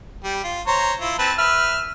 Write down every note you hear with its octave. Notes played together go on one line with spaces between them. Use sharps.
G3 G5
F4
C5 C#5 A#5
E4 F4
C4 B4 A5
B4 E5 F6